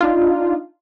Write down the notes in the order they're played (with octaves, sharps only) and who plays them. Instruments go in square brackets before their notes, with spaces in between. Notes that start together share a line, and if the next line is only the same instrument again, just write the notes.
[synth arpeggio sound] D4 D#4 F4